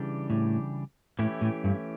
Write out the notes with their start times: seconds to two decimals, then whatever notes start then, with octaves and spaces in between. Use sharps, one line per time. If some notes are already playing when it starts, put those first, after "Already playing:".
Already playing: C#3 E3 G3 D4 G4
0.30 A2
1.19 A2 E3 A3 C#4 E4 G4
1.41 A2
1.64 G2